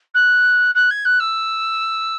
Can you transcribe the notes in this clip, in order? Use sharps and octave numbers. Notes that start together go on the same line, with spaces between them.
F#6
F#6
G#6
F#6
E6